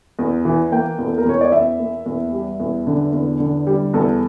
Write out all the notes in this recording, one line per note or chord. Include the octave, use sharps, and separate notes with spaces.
E2
E3
A#3 G5
E2
A4
A#4
E2 C#5
D5
E2 E5
A#3
E2
G3
E2
D3
E2
D3
G3
E2 A4